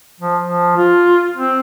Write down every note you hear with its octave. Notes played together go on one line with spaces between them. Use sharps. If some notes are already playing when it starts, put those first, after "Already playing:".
F3
F3
F4
C4